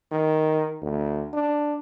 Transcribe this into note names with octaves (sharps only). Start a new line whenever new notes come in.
D#3
D2
D4